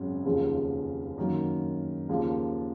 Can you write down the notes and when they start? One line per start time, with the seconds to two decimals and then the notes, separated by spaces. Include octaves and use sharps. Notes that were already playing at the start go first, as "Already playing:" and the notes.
Already playing: G#1 F#2 C#3 F#3
0.25 F1 D#2 C#3 F3
1.17 F#2 D#3 F#3 A#3
2.09 D#2 C#3 F3 A#3